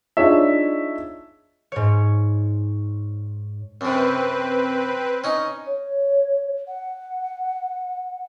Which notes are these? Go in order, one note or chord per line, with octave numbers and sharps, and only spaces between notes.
D4 D#4 F4 G#4 C#5 E5
G#2 C#5
F#2 C3 C4 B4
C#4 D#4
C#5
F#5